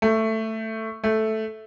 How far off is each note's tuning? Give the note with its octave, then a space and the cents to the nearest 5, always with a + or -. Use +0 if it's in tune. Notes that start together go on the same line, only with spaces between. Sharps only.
A3 +10
A3 -5